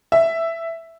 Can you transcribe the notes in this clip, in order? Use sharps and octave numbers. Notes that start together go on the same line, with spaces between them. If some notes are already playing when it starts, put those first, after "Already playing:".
E5